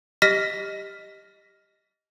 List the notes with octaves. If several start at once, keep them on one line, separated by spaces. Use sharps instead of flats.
G4 D#5 F6 A#6 B6